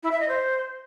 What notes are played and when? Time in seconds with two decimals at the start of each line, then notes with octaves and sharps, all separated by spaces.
0.03 E4
0.11 E5
0.20 D#5
0.28 C5